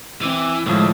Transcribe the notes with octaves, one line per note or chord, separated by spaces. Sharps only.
E3 C4 D6 D#7
D2 A2 D#3 F3 G#3